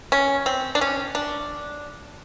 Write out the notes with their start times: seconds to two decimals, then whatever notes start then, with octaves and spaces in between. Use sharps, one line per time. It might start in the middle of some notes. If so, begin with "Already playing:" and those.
0.12 C#4
0.46 C4
0.75 D4
0.81 C#4
1.15 D4